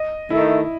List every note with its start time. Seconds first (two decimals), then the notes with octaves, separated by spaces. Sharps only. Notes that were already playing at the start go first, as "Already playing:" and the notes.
Already playing: D#5
0.30 D#3 A3 D#4 E4